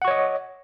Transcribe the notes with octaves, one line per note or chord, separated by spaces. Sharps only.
C#5 D#5 F#5 C#6